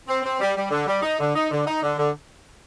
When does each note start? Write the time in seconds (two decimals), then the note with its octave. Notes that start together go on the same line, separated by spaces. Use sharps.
0.08 C4
0.23 C4
0.40 G3
0.56 G3
0.71 D3
0.87 G3
1.03 D#4
1.19 D3
1.35 D#4
1.51 D3
1.67 D#4
1.82 D3
1.98 D3